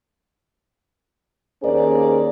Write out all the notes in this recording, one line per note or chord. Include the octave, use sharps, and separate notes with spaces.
D#2 A#3 C#4 G#4 C5 D5